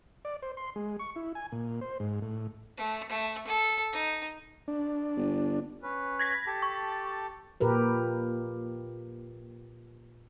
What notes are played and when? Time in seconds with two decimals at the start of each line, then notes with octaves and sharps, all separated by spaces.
0.25 D5
0.42 C5
0.57 C6
0.76 G#3
0.99 C#6
1.16 E4
1.35 G#5
1.52 A#2
1.81 C5
2.00 G#2
2.22 A2
2.77 A3
3.09 A3
3.47 A4
3.93 D#4
4.68 D4
5.17 G1
5.82 C#4 B4
6.19 G#6 A#6 B6
6.47 G4 A4 A5
6.62 C#6
7.60 A#2 G4 A#4 B4